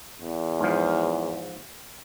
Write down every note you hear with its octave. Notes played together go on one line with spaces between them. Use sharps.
E2
G#2 F3